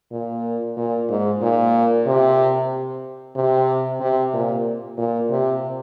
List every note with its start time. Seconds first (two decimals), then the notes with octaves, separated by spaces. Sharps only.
0.12 A#2
0.77 A#2
1.09 G#2
1.42 A#2
2.06 C3
3.36 C3
4.01 C3
4.33 A#2
4.98 A#2
5.30 C3